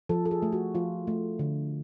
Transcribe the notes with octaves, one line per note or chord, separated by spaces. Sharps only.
F3 A4
A4
G#4
A3
F#4
F3 F4
A3
D3